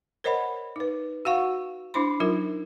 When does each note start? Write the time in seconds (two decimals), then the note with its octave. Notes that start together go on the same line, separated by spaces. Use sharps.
0.24 A#4 C5 C#5 D#5 F#5 B5
0.76 D#4 B4
1.25 F#4 F5 F#5 C#6
1.94 D4 E4 C5 B5 C6
2.20 F#3 D#4 F4 A#4